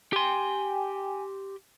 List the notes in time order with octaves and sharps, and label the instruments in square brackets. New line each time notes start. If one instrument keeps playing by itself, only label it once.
[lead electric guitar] G4 C6 [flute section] G5 G#5